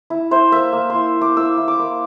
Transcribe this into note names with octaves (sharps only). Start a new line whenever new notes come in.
E4
E4 C5
A#3 E5
A#3
E4 C6
E4
D6
E4 E6
E4
D6
A#3